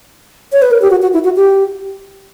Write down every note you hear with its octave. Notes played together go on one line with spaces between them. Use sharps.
C#5
B4
A#4
G4
F#4
F#4
E4
F#4
G4